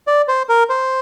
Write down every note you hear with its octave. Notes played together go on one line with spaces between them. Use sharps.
D5
C5
A#4
C5